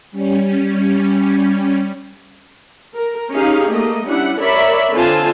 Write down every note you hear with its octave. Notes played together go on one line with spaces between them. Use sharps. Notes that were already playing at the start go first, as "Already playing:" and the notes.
G3 C#4
A#4
C#4 D#4 G4 G#4 F5
A3 A#3 D#5
G3 C#4 D4 E4 F#5
A#4 C#5 D5 E5 B5
D3 C4 F4 G#5 A5